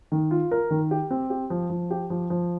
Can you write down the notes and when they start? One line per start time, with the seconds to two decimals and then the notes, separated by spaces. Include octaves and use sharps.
0.12 D#3
0.31 F4
0.51 A#4
0.71 D#3
0.91 G4
1.11 C4
1.30 G4
1.50 F3
1.70 F3
1.91 G4
2.10 F3
2.30 F3